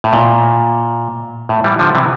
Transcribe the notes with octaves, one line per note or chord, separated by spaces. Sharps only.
A2
A#2
A2
E3 G3
D3 F3
C3 E3